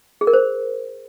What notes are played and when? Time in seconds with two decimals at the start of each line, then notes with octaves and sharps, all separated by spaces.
0.21 G#4
0.27 A#4
0.33 C5